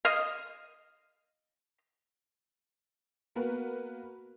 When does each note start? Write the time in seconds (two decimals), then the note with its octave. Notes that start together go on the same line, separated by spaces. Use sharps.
0.05 D#5 F5
3.36 A#3 B3 F#4 A#4 B4